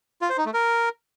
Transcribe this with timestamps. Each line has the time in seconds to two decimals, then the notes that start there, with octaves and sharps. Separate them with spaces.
0.22 F4
0.30 C5
0.38 D#4
0.46 A3
0.54 A#4